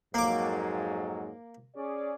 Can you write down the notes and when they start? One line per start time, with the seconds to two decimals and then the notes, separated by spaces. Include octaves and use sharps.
0.14 F2 G#2 F#3 A#3 D6
1.76 C#4 G#4 D5